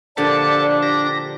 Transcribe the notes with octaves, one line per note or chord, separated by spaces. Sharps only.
A#2 D3 F3 D4 G4 A4 D5 A5
G4 A#6